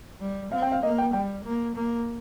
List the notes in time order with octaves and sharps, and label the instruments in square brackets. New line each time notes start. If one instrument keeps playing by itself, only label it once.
[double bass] G3
[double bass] C4 [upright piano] F5
[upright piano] G5
F5
[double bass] A#3 [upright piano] D#5
[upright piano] G5
[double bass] G3 [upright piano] G5
[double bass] A#3
A#3